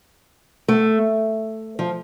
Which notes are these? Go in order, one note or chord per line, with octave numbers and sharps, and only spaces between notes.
A3
F3